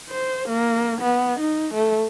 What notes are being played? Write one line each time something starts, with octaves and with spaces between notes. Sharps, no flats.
C5
A#3
B3
D#4
A3